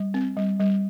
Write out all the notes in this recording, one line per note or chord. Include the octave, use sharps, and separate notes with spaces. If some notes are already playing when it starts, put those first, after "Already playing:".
Already playing: G3
C4
G3
G3